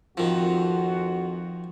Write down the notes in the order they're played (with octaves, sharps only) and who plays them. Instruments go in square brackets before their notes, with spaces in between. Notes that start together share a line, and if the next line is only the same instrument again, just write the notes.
[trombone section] F2 F#4 [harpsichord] D#3 F3